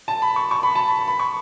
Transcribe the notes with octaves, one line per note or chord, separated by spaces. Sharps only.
A5
B5
C#6
C#6
B5
A5
B5
B5
C#6